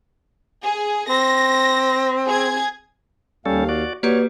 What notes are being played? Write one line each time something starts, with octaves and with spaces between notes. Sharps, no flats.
G#4
C4 A#6
G#4 G#6
D#2 G3 C#4 A4 F5
F#4 D5
A#3 F#4 G4 B4 C#5 D5